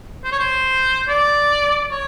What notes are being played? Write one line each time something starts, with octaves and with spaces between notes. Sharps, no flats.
C5
C#5
C5
D5
C#5